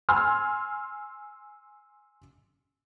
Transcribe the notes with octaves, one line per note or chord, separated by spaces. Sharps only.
G#5 C6 E6 F6